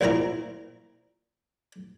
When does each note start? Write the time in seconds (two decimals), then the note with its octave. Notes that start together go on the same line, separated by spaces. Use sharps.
0.01 A#1 A#2 C4 E4 A#5